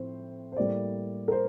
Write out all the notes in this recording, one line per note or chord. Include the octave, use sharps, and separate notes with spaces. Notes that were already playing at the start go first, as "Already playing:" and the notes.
Already playing: A2 F3 C4 C5
C5
A2 G3 A#3 D5
A#4
C5